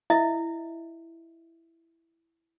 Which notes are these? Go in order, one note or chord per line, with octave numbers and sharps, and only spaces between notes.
E4 D#5 E5